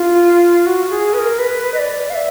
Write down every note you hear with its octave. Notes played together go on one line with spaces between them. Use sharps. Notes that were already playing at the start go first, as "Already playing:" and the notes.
Already playing: F4
F#4
G#4
B4
A#4
B4
D#5
D5
F5
E5